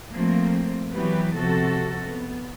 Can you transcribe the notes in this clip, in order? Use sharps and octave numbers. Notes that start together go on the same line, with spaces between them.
F3 A3 A#3 C4
E3 F#3 B3 G4 B4
C3 F3 F#4 A4
B3